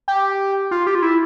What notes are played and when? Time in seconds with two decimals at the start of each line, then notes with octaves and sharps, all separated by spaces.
0.08 G4
0.71 F4
0.87 G4
0.95 F4
1.02 E4